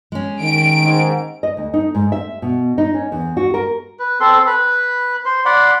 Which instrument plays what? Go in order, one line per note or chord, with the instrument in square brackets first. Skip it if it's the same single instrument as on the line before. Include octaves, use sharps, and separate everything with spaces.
[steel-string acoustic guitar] G#3 C#4
[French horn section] D#3 [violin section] D7
[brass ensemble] G#2
[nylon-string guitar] D#5
D2
D#4
G#2
E5
B2
D#4
C#4
E2
F#4
A#4
[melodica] B4
C4 A4 C6
B4 B5
C5 C6
D5 F#5 B5 C6